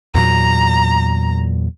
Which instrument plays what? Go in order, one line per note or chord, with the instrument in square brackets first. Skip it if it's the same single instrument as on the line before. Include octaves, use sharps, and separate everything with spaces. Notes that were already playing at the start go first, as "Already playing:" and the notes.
[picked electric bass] E2 A#2 F#3 [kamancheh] A#5